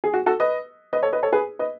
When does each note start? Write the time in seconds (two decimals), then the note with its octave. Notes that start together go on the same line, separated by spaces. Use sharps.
0.04 G#4
0.14 F#4
0.26 F#4 A4
0.40 B4 D#5
0.93 B4 D#5
1.03 A4 C#5
1.13 B4 D#5
1.23 A4 C#5
1.32 G#4 B4
1.59 B4 D#5